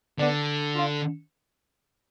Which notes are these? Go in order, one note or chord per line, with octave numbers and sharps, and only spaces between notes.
D3 B3 D4
D4 F4